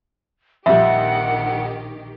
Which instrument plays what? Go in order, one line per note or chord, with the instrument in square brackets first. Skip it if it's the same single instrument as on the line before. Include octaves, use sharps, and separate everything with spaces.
[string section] A#1 D#3 G4 [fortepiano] F2 G3 [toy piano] E5 [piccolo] F#5